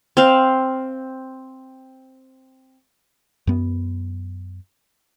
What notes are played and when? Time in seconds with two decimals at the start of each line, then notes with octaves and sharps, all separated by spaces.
0.17 C4 F5
3.47 F#2 B3